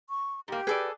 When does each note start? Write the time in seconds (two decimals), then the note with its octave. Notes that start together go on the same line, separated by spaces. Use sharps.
0.09 C#6
0.48 G#2 A#3 G4
0.67 G#4 A4 B4 D5